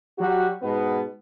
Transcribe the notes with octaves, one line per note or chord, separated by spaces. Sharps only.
F#3 G3 F#4
G#2 B2 B3